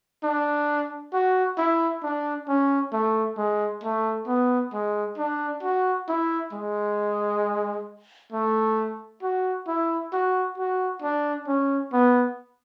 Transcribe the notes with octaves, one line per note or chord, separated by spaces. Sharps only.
D4
F#4
E4
D4
C#4
A3
G#3
A3
B3
G#3
D4
F#4
E4
G#3
A3
F#4
E4
F#4
F#4
D4
C#4
B3